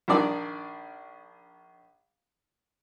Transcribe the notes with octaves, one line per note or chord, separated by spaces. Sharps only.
A#1 D#3 D4 D5